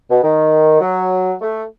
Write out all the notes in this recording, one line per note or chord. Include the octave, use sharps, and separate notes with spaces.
B2
D#3
F#3
A3